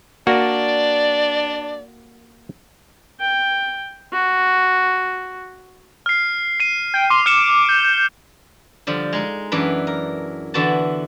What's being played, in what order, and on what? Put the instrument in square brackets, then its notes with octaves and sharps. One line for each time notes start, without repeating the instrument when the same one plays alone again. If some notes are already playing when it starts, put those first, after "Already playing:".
[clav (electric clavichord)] A#3 F#4 [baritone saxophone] D4 [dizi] D5
[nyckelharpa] G5
F#4
[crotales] F6 C7
C7 D#7
[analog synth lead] G5
[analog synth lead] C6 [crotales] D6 D#7
[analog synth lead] D6 [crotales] F6 C#7 E7
[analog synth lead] G6
[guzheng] D3 F3 G3
G#3 D#4
F#2 E3 D4 B4
A#4
D3 E3 B3 F#4 A5